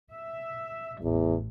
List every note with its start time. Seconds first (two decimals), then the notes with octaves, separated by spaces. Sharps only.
0.11 E5
1.02 A1 E2